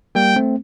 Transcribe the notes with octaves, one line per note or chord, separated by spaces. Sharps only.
G3 A#3 G5
A3 C4